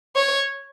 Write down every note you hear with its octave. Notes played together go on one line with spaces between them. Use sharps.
C#5